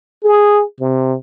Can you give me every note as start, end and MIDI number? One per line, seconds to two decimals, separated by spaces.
0.24 0.63 68
0.80 1.16 48